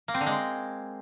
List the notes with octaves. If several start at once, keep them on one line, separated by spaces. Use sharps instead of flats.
A#3
C4
D3
G#3